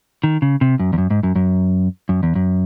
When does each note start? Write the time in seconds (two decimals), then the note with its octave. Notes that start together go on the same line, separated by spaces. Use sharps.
0.24 D#3
0.42 C#3
0.61 C3
0.79 F#2
0.93 E2
0.98 F#2
1.10 G#2
1.23 F#2
1.35 F#2
2.09 F#2
2.23 E2
2.35 F#2